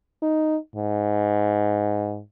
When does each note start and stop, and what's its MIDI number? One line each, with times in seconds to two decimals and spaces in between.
0.22 0.56 63
0.76 2.21 44